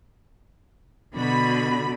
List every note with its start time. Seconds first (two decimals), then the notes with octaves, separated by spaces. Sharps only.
1.15 B2 D3 F#4 B5